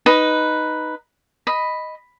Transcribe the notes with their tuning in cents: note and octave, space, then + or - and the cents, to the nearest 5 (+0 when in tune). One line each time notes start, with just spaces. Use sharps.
D#4 +0 B4 +0
D#5 +0 B5 +0